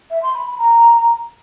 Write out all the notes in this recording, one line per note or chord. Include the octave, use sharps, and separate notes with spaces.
E5
C6
B5
B5
A#5